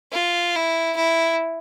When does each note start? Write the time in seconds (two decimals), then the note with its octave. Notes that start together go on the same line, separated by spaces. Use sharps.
0.12 F4
0.55 E4
0.96 E4